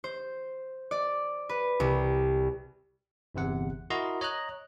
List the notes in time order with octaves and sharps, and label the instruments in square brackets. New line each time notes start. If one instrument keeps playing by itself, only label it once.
[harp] C5
D5
B4
C2
[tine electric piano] G1 E2 C3 F#5
E4 F#4 A#4 D#5 A#5 C6
C#5 D#5 A#5 F#6